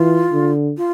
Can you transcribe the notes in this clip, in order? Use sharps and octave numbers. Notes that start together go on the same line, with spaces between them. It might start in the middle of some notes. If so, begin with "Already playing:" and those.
Already playing: E3 F4
D3
F4